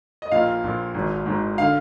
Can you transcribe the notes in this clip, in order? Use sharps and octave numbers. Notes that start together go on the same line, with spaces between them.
D#5
A#1 A#2 F5
A#1 A#2
G#1 G#2 D#3
G#1 G#2 D#3
D3 F5